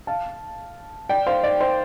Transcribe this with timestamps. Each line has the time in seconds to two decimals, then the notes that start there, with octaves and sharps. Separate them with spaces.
0.07 F5 A5
1.09 D5 G5
1.27 C5 F5
1.44 D5
1.61 C5